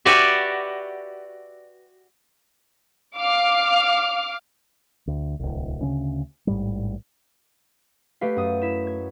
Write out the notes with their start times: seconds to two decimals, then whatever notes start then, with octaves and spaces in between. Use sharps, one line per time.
0.05 F#4 G4 B4 D5 E5
3.17 F5 D6 F6
5.07 D2
5.39 D1 C2
5.81 D2 C#3 E3 C#4
6.47 A1 G#2 G3
8.21 A3 G4 B4 F5
8.36 F#2 D#6
8.62 E4 B6 E7
8.87 G#6